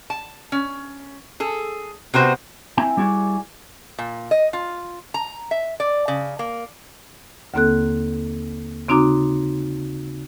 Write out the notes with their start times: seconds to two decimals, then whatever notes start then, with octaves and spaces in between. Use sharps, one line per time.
0.10 A5
0.52 C#4
1.40 G#4 A4
2.14 C3 B3 F#4 C5
2.77 C4 E4 G5 G#5
2.97 G3 E4 F#4 G#4 D5
3.99 A#2
4.31 D#5
4.53 F4
5.14 A#5
5.51 E5
5.80 D5
6.08 C#3
6.39 A#3
7.54 D#2 D3 A#3 C4 A4 F#6
8.88 C#3 C4 D#4 F#4 A#5 D6